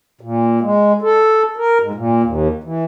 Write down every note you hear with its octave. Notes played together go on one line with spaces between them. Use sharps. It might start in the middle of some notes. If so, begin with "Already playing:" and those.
A#2
G#3
A4
A#4
G#2
A#2
D#2
E3